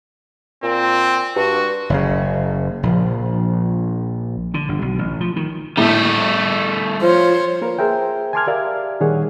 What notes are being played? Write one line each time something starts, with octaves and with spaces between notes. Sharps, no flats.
A#2 C4
G2 F#4
F#1 C#3
A#1 F3
D3
G1
B1
A1
F3
D#3
A2 G3 A3
F3 C5 C#5
A#3 F4 A#4 B4
G#4 A#4 C5 E5 G5
G#5 A5 C6 D6 F6 G#6
G4 A#4 D5 E5 F5 F6
A#2 D#3 G3 G#4 C#5 F#5